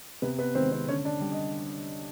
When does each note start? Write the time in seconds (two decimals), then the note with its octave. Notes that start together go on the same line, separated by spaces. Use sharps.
0.22 C3 B3 B4
0.39 B3 B4
0.55 D#3 G#3 C4 C5
0.72 C4 C5
0.88 D3 C#4 C#5
1.05 D4 D5
1.21 G3
1.32 D#5